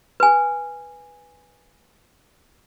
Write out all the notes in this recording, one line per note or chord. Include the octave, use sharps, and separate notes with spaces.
B4 G#5